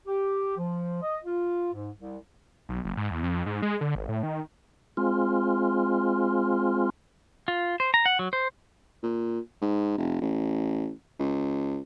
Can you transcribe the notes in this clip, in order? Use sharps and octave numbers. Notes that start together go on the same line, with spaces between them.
G4
F3
D#5
F4
G#2
C2
B1
F#1
G#2
E2
F2
G#2
G#3
D3
G#1
A2
D#3
G#3 C4 F4
F4
C5
A#5
F#5
F#3
C5
A#2
G#2
F1
A1
C#2